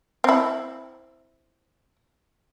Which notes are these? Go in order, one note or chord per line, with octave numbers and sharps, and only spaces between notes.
C4 E4